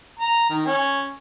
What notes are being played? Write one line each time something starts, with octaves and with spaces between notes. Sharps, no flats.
A#5
D#3
C#4